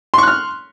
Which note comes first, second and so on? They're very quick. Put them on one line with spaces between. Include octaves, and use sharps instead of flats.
C6 C#6 F#6 F6